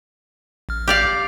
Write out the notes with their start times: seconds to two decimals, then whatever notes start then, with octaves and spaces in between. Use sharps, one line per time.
0.69 A1 F6
0.88 G4 D5 F5